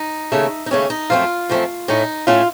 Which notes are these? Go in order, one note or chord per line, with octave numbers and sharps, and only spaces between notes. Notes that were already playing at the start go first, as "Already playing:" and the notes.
Already playing: D#4
D#2 C#3 A3
D#4
D#2 C#3 A3 C#4
D#4
F#2 F3 A3 C4 F4
F#2 F3 A3 C4
A2 A3 C#4 D#4
A2 A3 C#4 F4